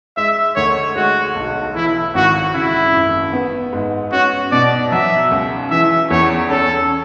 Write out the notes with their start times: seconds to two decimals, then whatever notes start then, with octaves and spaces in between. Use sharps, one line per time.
0.17 G#3 E5
0.56 D2 C#5
0.96 G#3 F#4
1.35 B1
1.75 E3 E4
2.15 G#1 F#4
2.54 C#3 E4
2.94 F#1
3.33 B3
3.73 G#2
4.12 C#4 F#4
4.52 B2 D5
4.91 F#3 E5
5.31 C#2
5.71 E3 E5
6.10 E2 C#5
6.50 C#4 A4